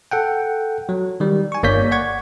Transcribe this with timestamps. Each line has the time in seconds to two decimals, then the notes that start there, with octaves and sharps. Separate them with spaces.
0.11 A4 F#5 G5
0.89 F#3
1.20 D#3 G3
1.52 G#5 C#6
1.63 G1 A#3 C#5 D5 G6 B6
1.91 D5 F#5 C#6 G#6